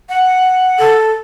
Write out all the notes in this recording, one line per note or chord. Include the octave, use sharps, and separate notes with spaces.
F#5
A4